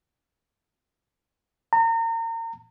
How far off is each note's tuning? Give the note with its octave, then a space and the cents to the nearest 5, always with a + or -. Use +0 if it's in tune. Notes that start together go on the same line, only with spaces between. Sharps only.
A#5 -35